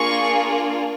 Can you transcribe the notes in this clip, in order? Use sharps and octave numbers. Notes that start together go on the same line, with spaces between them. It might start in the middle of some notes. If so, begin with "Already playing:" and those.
Already playing: A#3 D4 F4 G#4 C#6